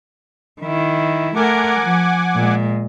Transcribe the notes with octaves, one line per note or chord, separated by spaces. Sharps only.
D#3 E4
A3 A#4 F#5 G#5 D6
F3
A#2 G#3